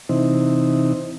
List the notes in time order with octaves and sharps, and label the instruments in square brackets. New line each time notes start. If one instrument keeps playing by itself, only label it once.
[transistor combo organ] C3 E3 C4 D#4